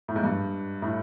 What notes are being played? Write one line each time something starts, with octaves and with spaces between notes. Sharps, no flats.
A2
G#2
G2
A2